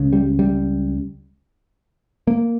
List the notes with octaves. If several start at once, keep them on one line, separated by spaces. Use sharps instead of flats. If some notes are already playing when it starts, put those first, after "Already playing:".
Already playing: C#2 C#3
G3
G3
A#3